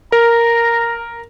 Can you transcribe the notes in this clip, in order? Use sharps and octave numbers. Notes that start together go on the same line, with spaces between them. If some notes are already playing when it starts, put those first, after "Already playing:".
A#4 A#5